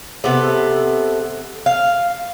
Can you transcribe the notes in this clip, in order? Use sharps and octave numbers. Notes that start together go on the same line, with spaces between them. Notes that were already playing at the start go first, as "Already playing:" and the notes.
C3 B3 A4
F5